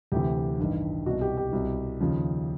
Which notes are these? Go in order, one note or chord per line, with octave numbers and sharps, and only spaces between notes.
D2 C3 E3 G4
A1 G2 D#3
C2 B2 F#4
G4
G4
C2 B2
D#2 C#3 F3